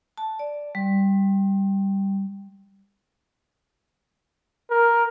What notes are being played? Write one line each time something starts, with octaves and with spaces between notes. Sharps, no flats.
A5
D5
G3
A#4